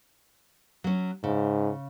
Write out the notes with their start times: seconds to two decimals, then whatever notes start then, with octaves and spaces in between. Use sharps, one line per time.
0.84 F#3 C#4
1.24 G#2 C#3